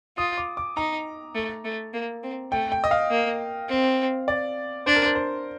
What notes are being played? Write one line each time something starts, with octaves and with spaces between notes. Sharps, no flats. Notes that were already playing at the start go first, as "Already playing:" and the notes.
F4 D#6
D6
D6
D#4 A#5
A3
A3
A#3
C4
A3 G5
G5
D#5
F5
A#3
C4
D5
D4 C5
A#4
C5
C5